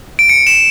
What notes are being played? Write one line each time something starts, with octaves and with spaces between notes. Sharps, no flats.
D7
C#7
E7